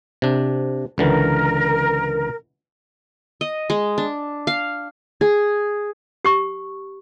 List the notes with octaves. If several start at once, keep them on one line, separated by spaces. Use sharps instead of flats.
C3 D4
C#2 D3 E3 A#4
D#5
G#3
D4
F5
G#4
G4 C#6